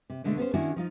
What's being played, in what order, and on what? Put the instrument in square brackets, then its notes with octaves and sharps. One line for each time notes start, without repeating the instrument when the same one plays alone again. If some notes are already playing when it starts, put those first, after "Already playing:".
[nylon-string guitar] C3
B2 D3 G#3 A3 D4
B3 C#4 B4 C5
D#3 C#4 D4 E4 F#4
F3 D#4 F4